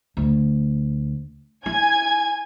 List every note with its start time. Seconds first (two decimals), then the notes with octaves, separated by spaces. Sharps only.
0.17 D2
1.66 E4 G#5 G#6